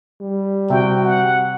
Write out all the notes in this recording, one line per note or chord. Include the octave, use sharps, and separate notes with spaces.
G3
C3 F#4 G5
F#5